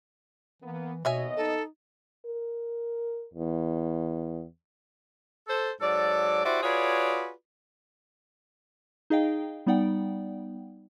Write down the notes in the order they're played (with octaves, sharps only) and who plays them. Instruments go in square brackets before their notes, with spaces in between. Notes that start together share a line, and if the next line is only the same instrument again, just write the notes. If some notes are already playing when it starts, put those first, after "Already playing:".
[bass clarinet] E3 [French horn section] A#3 B3
[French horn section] D#2 B3 D#5 [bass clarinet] B2 [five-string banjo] C#5 E5 G#5
[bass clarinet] D#4 [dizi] A4
[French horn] A#4
E2
[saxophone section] A4 C5
G#2 F#3 A4 D5
E4 F#4 G4 C5 D5 E5
F4 F#4 G#4 B4 C#5 D5
[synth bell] D#4 G#4 D#5 F5 G5
G3 B3 D#4 D5 F#5 G5